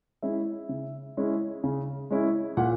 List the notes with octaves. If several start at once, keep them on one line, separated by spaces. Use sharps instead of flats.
G#3 C#4 E4 E5
C#3
G#3 C#4 E4
C#3
G#3 C#4 E4
A#2 F#5